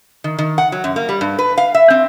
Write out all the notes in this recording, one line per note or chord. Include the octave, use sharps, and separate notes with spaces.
D#3
D#3
F#5
F#3
F#2
A#3
G3
G2
B4
F5
E5
C4